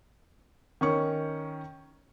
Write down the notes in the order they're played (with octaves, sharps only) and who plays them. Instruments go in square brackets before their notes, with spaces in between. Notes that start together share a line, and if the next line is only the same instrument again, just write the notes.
[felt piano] D#3 C#4 C#6